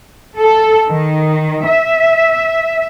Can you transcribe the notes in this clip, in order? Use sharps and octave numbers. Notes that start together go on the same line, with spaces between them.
A4
D#3
E5